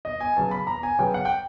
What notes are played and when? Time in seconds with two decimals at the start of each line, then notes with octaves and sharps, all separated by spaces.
0.05 E2 D#5
0.21 G#5
0.36 C#3 F#3 B3 A5
0.51 B5
0.67 E2 A#5
0.83 G#5
0.99 C#3 F#3 B3 G5
1.14 F#5
1.25 G5